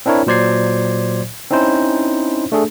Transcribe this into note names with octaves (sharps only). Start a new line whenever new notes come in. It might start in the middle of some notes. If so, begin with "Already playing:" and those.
C4 D4 E4 A#4 C#5
A#2 F#3 C5 D5 G#6 C7
C4 C#4 D#4 E4 C5
A3 D4 G#4 A4